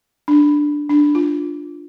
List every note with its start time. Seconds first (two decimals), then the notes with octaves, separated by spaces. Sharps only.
0.28 D4
0.90 D4
1.15 F4